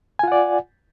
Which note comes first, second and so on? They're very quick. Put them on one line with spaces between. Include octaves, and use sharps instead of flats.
G#5 F4 F#5 D5